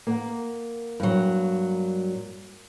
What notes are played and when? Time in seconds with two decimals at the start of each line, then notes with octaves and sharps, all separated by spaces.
0.07 A#3 A#4 F#5
1.00 G2 F#3